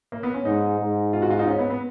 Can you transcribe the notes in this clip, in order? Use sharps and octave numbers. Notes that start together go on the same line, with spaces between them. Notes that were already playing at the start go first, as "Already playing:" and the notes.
A#3
B3
C#4
G#2 D#4
G#2
F4
F#4
F4
D#4
C#4
B3
B3